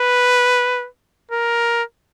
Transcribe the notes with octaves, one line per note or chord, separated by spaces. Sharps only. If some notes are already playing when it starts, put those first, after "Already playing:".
Already playing: B4
A#4